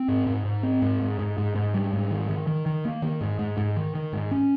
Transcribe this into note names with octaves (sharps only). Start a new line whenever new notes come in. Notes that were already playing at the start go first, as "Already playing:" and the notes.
Already playing: C4
G#2
G#2
G#2
C4
G#2
G#2
G#2
G#2
G#2
G3
G#2
D#3
D#3
D#3
D#3
A#3
D#3
G#2
G#2
G#2
D#3
D#3
G#2
C#4